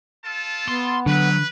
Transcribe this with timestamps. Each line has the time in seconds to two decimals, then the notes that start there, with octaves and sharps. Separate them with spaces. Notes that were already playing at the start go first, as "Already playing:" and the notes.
0.24 F4 A4 A5
0.68 B3 C6
1.06 D3 F#3 B4